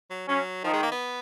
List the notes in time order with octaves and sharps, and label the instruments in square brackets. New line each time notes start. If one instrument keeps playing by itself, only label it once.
[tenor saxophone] F#3
[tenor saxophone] F#3 [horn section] C#4
[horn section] D#3 [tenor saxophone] F3
[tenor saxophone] G#3
A#3
B3